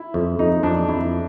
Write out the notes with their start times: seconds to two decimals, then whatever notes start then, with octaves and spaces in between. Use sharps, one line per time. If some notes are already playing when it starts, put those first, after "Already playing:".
Already playing: E4
0.14 F2
0.39 F2 D#4
0.63 F2 D4
0.89 F2 E4